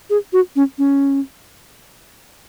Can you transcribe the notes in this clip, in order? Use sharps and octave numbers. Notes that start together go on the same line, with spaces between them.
G#4
F#4
C#4
C#4